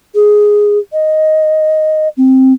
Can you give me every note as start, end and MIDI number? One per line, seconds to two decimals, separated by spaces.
0.15 0.79 68
0.93 2.08 75
2.17 2.53 60